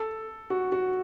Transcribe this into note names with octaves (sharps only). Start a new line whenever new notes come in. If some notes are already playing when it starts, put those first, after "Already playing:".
Already playing: A4
F#4
F#4